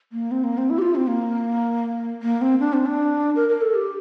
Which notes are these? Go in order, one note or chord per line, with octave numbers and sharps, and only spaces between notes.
A#3
C4
A#3
C4
E4
G4
F4
C4
A#3
A#3
C4
D4
C4
D4
A#4
A#4
A4
G4